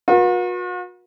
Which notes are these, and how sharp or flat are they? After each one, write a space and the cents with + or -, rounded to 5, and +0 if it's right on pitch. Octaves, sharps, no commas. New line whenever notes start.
F#4 -45 B4 -45